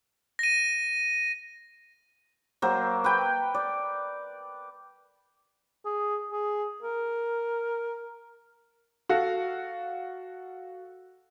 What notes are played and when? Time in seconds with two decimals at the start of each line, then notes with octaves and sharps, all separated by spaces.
0.39 A#6 D#7
2.62 F#3 A#3 C5
3.04 B4 G5
3.54 D5
5.85 G#4
6.32 G#4
6.83 A#4
9.09 F#4 A4 F5